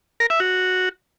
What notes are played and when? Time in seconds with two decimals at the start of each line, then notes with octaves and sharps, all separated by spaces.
0.20 A#4
0.30 E5
0.40 F#4